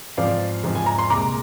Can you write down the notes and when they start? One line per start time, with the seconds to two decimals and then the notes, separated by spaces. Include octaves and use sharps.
0.17 G#2 F3 C4 D5 F5
0.64 G#2 F3 C4
0.75 G#5
0.86 A#5
0.99 C6
1.10 C2 A#2 G#3 A#5 D6